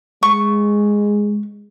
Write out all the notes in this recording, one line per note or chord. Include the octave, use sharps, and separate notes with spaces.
G#3 C#6